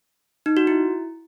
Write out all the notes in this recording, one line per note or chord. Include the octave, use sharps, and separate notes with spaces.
D#4
F#4
E4